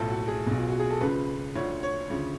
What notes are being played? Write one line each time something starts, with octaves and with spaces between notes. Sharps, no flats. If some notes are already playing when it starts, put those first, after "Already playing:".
Already playing: B1 A2 F3 A4
F#4
G#4
B1 B2
F4
F#4
G#4
A4
C#2 C#3 F3 B4
D2 D3 F3 C#5
C#5
D2 C#3 F3